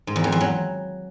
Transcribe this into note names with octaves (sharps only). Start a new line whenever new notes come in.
G#2
E2
F2
E2
F#3